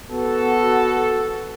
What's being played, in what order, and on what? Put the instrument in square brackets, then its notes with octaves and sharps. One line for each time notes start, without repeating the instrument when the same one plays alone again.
[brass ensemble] B3 F#4 A4